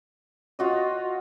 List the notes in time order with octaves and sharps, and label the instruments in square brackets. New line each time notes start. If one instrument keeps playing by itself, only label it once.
[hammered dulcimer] F4 F#4 D#5